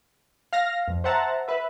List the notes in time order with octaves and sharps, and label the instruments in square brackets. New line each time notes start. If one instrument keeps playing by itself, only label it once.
[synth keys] F5 F6 A#6
F2
C5 E5 F#5 A5 A#5
B4 E5